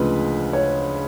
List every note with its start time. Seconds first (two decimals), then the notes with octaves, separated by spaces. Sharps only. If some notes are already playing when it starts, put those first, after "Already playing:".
Already playing: D2 C#3 F3 G#3 B4
0.53 C#5